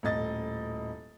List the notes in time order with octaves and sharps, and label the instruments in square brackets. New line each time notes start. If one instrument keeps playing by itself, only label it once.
[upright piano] D#1 A2 D#5 A6